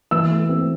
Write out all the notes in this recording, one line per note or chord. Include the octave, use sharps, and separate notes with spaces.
E3 E6
A3
C4